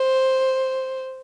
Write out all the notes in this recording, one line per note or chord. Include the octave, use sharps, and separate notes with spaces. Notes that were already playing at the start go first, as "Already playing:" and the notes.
Already playing: C5